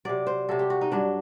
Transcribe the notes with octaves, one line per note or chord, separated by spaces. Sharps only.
C3 F#3 D5
C5
C3 F#3 A4
G4
F#4
D#4
G2 F#3 D4